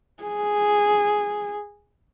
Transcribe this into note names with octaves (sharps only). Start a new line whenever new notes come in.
G#4